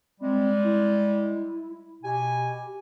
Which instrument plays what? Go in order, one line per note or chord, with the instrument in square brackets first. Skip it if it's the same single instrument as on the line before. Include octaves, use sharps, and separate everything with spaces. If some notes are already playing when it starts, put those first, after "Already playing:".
[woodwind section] G3 G#3 [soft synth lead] C4
[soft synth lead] E4
[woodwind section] B2 G#5 [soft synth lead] G4